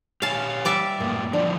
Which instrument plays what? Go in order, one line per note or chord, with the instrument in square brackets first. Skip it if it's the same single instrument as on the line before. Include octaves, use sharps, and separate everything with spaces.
[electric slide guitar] G4 C#5 G#5 [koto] F5 A5
[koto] G3 D5 E5
[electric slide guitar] F#2 A2 B3 [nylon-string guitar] A#3
[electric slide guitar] D3 E3 F3 [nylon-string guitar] D4